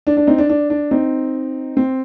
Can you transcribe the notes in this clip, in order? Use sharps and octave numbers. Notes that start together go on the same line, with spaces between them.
D4
D4
C4 D#4
D4
D4
D4
C4 D#4
C4